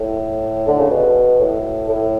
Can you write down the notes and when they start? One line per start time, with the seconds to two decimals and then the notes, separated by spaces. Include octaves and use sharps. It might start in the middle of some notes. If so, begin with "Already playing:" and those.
Already playing: A2
0.68 D3
0.79 C#3
0.91 B2
1.40 A2
1.89 A2